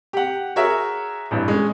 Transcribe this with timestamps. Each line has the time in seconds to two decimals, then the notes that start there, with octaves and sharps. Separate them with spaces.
0.13 G4 F#5
0.56 F#4 G#4 A#4 C#5 E5
1.31 A1 G2
1.48 G#3 C#4